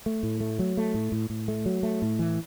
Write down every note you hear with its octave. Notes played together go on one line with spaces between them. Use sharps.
A3
A2
A3
F#3
A3
A2
A2
A2
A3
F#3
A3
A2
E3